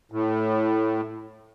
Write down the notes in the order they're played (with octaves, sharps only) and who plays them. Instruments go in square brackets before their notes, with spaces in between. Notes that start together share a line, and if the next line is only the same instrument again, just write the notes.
[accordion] A2